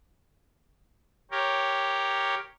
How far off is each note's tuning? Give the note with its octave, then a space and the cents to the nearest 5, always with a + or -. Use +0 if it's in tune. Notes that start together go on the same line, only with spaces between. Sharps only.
G4 +0 A#4 +0 C#5 -5